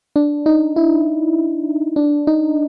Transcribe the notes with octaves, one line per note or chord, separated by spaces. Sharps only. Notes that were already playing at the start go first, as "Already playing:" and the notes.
D4
D#4
E4
D4
D#4